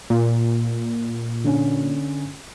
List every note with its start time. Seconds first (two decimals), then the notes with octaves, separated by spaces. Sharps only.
0.10 A#2
1.44 D3 C#4